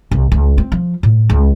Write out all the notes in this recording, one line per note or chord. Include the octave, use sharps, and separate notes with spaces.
C2
C#2
C4
F3
A2
C#2